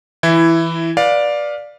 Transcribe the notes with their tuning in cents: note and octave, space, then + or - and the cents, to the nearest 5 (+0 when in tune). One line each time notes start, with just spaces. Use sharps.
E3 +0 E4 +10
B4 -10 D5 +0 F5 +15